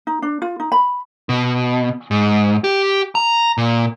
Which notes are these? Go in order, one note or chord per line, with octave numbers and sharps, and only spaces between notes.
D#4
D4
F4
D#4
B5
B2
G#2
G4
A#5
A#2